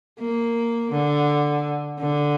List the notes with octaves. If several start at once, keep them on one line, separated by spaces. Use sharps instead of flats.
A#3
D3
D3